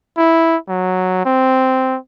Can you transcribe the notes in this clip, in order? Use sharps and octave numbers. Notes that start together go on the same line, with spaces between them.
E4
F#3
C4